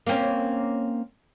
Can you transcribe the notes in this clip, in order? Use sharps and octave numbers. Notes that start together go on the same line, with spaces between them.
A#3 C4 C#4